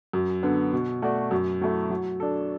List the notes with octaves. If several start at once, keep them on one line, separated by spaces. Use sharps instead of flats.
F#2
D3 B3
B2
A3 F#4 D5
F#2
F#3 A3 E4
F#3
D4 A4